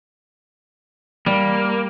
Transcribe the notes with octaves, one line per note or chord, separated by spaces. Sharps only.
G3 A#3